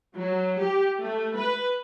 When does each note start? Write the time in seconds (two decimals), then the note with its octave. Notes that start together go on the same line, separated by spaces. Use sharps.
0.16 F#3
0.59 G4
1.00 A3
1.36 B4